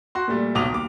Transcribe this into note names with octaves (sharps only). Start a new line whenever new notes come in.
F#4 C6
A#2 G3 A3
D#1 B1 D6 D#6 F7
D#2 D6